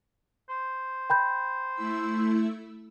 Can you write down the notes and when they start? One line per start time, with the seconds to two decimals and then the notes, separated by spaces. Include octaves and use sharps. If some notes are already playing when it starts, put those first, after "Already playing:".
0.49 C5
1.10 G5 B5 G6
1.74 A3 E4 E6